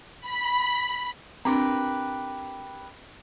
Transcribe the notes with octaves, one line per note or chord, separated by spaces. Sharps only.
B5
C4 D4 G4 A#4 B4